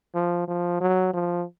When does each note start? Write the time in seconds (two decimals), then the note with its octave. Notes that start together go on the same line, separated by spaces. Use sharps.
0.15 F3
0.48 F3
0.81 F#3
1.14 F3